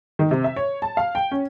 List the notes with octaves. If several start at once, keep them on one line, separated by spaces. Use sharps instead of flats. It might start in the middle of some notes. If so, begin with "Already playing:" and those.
D#3
C3
E5
C#5
A5
F5
G5
C#4